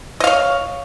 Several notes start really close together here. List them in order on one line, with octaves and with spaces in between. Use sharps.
D#5 F5 C#5